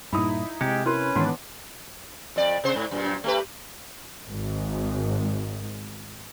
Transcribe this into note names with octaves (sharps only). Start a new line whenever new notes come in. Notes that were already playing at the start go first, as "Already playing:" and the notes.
G2 A#2 D#4 E4 B5 D#6
C3 G#3 G4 C#7
C#4 E4 A#4 B4 C6
G#2 D#3 E3 B3 D4 C#5 C6
F2 D5
C3 C5
G#2
F#2 A#2
A3 G4 B4
G#1 G#2